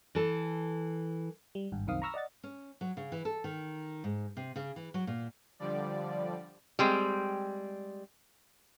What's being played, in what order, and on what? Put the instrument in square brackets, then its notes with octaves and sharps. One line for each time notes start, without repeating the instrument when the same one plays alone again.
[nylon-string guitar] E3 A4
[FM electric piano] G3
G#1 G2
C2 F#2 D#3 C4 F5 D#6
A#5 B5 C#6 E6 F6 A#6
D5 D#5 F#5 A6
[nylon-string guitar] C#4
F#3
C#3
E3
A4
D#3
G#2
C3
C#3
E3
F#3
A#2
[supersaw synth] D3 F3 G3 D5
[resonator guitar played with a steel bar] G3 G#3 C4